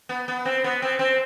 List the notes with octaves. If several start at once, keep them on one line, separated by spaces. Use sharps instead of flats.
B3
B3
C4
B3
C4
C4